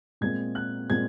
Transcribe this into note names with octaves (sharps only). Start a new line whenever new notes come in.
A#2 G#3 C4 G#6
F#6
A#2 G#3 C4 G#6